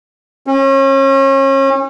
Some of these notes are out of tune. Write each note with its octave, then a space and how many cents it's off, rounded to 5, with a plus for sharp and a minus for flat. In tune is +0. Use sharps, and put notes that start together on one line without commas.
C#4 -35